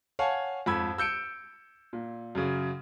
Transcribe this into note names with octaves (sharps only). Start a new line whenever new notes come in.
C#5 F5 F#5 G#5 A5 C#6
F2 G#2 B5 E6 G#6
E6 G6 C#7 D7
A#2
F#2 C#3